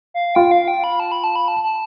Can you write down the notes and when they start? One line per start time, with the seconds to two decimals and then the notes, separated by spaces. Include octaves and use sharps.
0.14 F5
0.35 F4 G5
0.51 F5
0.68 G5
0.84 B5
1.00 A5
1.12 B5
1.24 A5
1.36 B5
1.48 A5
1.63 A5